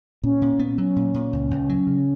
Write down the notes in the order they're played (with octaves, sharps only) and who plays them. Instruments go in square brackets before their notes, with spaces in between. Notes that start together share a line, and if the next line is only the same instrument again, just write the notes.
[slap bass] A#2 [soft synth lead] C#4
[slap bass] A#2
B3
[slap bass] F#3 [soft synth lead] C#4
[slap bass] A#2
A#2
C#2
C#2
F#3
C#3